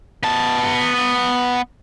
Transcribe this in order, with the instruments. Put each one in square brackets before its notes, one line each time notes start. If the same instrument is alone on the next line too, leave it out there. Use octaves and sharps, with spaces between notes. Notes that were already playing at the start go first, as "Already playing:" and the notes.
[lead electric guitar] B3 A5